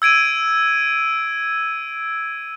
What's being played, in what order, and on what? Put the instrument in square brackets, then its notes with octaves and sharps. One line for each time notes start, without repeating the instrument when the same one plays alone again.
[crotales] E6 G#6 D7 D#7